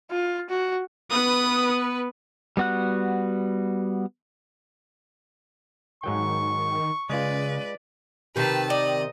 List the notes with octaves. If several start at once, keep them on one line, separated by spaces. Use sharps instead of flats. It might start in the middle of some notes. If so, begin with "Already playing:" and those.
F4
F#4
B3 B4 D#6
G3 B3 F#4 F#5 F#6
G#2 D#3 F#3 G5 C#6
C#3 G#3 F4 B4 D5
C3 D#3 G4 B4 A5
D5 D#5